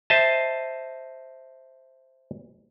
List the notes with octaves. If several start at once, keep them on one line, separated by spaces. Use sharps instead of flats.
C5 D#5 E5 A5